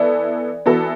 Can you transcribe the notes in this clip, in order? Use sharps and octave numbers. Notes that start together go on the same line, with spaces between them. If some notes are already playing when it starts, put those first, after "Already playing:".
Already playing: E3 B3 A4 D5
E3 B3 F#4 A4